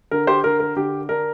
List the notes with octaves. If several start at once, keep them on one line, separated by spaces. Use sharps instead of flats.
D3 A#4
G4 C5
D3 A#4
A#4
D3 G4
D4 A#4